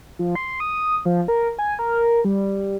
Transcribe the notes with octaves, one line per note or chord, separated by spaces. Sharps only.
F3
C6
D#6
F3
A#4
G#5
A#4
G3